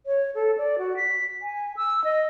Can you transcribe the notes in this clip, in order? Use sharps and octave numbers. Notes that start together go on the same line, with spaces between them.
C#5
A4
D5
F#4
B6
G#5
E6
D#5